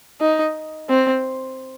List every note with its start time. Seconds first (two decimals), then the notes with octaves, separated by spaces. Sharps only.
0.21 D#4
0.89 C4